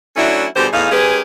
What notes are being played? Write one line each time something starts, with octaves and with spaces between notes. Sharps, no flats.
F#3 A3 C#4 D4 E4
B2 D3 G3 G4 G#4 C5
E2 A2 D#4 G#4 F5
G#3 C#4 G4 G#4 A#4 B4